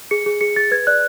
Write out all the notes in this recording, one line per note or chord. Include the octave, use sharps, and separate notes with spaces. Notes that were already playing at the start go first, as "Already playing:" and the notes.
G#4 C#7
G#4
G#4 C#7
G#4 A6
B4 G#6
D5 F#6